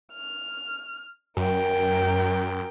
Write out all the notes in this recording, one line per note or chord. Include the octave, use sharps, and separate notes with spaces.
F6
F#2 A#4 G5